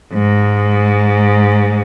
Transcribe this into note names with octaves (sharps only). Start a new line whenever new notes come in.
G#2